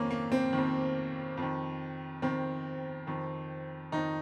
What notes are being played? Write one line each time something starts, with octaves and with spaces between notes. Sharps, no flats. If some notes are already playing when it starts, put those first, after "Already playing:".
Already playing: F2 D#3 A#3 C#4
A#3
C4
F2 D#3
F2 D#3
F2 D#3 C4
F2 D#3
F2 D#3 D#4